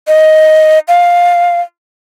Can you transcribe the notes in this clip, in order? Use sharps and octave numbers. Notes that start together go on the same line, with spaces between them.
D#5
F5